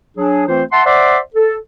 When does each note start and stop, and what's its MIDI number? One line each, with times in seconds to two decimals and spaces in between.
0.16 0.43 54
0.16 0.43 62
0.16 0.43 68
0.47 0.62 52
0.47 0.62 57
0.47 0.62 60
0.47 0.62 65
0.47 0.62 72
0.71 0.85 76
0.71 0.85 78
0.71 0.85 81
0.71 0.85 84
0.85 1.17 72
0.85 1.17 74
0.85 1.17 76
0.85 1.17 78
0.85 1.17 84
0.85 1.17 86
1.34 1.55 69